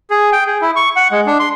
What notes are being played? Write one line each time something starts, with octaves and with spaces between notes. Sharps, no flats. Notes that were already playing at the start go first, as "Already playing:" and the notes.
G#4
G5
G#4
E4
C#6
F#5
G#3
D4
C6